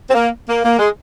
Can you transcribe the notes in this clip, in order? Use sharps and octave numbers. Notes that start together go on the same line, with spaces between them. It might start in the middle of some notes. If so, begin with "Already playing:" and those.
C4
A#3
A#3
A#3
G#3